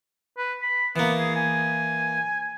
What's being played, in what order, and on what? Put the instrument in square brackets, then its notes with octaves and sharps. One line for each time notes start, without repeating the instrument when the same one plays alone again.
[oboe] B4
B5
[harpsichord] E3 A#3 [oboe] B3
[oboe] G#4
G#5